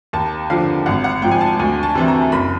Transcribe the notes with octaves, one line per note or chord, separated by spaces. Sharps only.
D#2 A5
D3 F3 F5
G#1 F#5
F#5
G#2 F3 G5
G#5
A5
D2 G#5
A5
C3 E3
A#5
F#1 B5